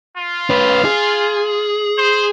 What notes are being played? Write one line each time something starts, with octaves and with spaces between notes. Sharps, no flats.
F4
C#4 B4
G#4
C5